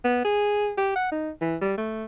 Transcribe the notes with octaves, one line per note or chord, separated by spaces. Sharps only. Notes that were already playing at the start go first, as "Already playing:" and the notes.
B3
G#4
G4
F#5
D#4
E3
G3
A3